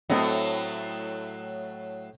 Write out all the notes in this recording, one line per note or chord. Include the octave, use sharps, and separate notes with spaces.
A2 F#3 A3 C4 D#5